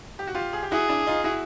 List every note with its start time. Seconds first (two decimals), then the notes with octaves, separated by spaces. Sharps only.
0.19 G4
0.27 F#4
0.35 F4 G4
0.53 G#4
0.63 G4
0.72 E4 F#4 G#4
0.89 D4 E4
1.07 D#4 F4
1.24 E4 F#4